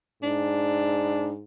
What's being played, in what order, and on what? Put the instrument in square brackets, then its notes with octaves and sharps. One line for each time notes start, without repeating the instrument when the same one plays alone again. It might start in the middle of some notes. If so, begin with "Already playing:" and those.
[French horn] G#2 [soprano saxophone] D4